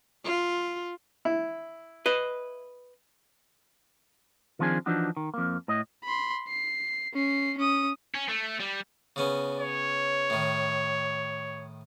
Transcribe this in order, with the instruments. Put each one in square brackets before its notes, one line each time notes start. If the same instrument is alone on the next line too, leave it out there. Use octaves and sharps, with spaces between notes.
[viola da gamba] F4
[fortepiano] E4
[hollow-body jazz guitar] B4 D#5
[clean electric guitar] D#3 F3 C4 D4 G#4
E3 F3 D4 D#4 F#4
D#3
F2 A#3
A2 D#5
[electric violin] B5 C6
C7
C#4 C7
C#4 D#6
[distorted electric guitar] C#4
A3
G3
[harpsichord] C#3 B3 C#4
[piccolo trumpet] C#5
[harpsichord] A2 D#3